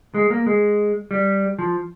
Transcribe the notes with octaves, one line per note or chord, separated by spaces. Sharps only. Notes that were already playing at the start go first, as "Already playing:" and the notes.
G#3
A#3
G#3
G3
F3